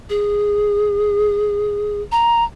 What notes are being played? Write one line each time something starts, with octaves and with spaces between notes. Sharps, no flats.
G#4
A#5